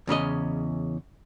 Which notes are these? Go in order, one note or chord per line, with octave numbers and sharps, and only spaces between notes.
E2 C#3 C#4 D#5